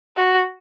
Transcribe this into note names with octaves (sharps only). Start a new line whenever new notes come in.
F#4